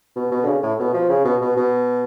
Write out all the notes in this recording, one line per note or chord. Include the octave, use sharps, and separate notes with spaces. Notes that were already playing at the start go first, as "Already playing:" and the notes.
B2
B2
D3
C#3
A2
B2
F3
C#3
B2
B2
B2